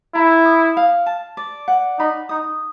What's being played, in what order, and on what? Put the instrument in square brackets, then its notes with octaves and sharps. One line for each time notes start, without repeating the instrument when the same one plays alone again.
[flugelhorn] E4 [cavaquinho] A#5
[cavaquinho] D#6
F5
A5
D5
F#5
[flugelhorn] D#4 [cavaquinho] B5
[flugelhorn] D#4 [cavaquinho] D#6